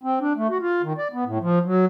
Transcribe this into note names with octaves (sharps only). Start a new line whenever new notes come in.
C4
D4
A3
F#4
F4
D#3
D5
B3
A2
F3
F#3